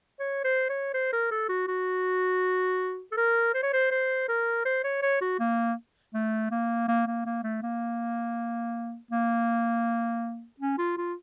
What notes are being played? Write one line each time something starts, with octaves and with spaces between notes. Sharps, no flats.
C#5
C5
C#5
C5
A#4
A4
F#4
F#4
A4
A#4
C5
C#5
C5
C5
A#4
C5
C#5
C#5
F#4
A#3
A3
A#3
A#3
A#3
A#3
A3
A#3
A#3
C#4
F4
F4